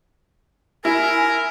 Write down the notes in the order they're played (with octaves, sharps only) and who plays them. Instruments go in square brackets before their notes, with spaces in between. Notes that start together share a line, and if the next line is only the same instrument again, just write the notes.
[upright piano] E4 [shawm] A#4 [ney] G#5